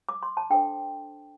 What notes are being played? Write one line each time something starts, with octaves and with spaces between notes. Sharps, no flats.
D6
C6
A5
D4 A4 C5 G5